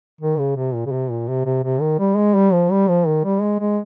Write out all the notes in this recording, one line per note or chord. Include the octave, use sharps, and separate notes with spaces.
D#3
C#3
C3
A#2
C#3
C3
A#2
C3
C3
C3
D#3
G3
G#3
G3
F3
G3
F3
D#3
G3
G#3
G#3